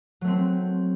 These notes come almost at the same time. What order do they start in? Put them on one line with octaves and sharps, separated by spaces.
F#3 A3 C4